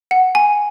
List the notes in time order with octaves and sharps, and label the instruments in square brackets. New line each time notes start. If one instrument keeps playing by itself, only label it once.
[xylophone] F#5
G#5